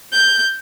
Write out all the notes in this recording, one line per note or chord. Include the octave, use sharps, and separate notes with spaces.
G6